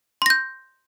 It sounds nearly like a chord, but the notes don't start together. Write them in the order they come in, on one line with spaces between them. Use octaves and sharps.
C6 A#6 G6